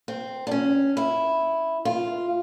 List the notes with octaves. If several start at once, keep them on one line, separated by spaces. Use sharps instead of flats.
C4
D4
C#4
E4
F4